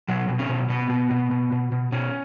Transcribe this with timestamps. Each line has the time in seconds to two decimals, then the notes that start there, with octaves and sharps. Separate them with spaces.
0.08 B2 F#3
0.28 B2
0.39 C#4
0.49 B2
0.69 B2 B3
0.90 B2
1.11 B2
1.31 B2
1.52 B2
1.72 B2
1.92 B2 C#4